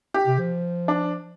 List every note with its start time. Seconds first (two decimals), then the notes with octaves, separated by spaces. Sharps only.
0.14 G4
0.27 C3
0.39 F3
0.88 D4